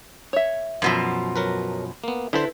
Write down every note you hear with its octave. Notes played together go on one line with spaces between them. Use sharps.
C#5 E5
F#2 B2 F3
F#3 A#4 B4
A#3 B3
D3 E4 A4 B4 C5